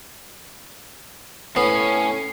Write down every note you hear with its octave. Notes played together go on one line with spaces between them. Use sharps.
A2 B3 C#4 C#5 C7